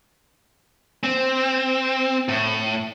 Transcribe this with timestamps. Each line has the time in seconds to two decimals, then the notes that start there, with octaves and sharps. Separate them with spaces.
1.03 C4
2.29 A2